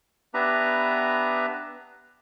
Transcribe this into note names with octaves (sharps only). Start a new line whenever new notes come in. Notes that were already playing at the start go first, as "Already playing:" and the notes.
B3 D4 G4 B4 E5 A#5